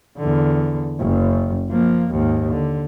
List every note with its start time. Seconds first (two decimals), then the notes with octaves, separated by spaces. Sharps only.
0.19 E2 D3
1.00 F#1 F#2
1.70 F3 A#3
2.11 D#2 G#2
2.52 D3